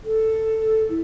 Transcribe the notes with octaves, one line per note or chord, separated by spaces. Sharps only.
A4
E4